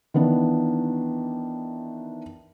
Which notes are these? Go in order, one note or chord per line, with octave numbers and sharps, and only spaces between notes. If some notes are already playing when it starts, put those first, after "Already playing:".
D#3 E3 B3 D4